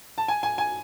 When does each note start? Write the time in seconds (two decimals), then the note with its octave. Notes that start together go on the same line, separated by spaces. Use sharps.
0.18 A5
0.28 G#5
0.43 G#5
0.58 G#5